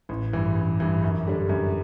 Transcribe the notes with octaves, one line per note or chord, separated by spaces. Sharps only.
A1
G2 E3
A1
G2 E3
F#2
D3 G3 D4
F#2